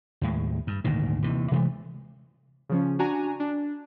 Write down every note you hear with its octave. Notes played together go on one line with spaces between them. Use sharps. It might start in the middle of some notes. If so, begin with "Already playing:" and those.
D#2 A2 G#3
G2
G#1 D2 A#2 D#3
D#2 C3 E3
C3 E3 G#3 A3
C#3 F3 C#4
D4 F#4 G#5 A#5
D4